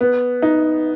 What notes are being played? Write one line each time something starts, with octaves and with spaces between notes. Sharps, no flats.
B3
D#4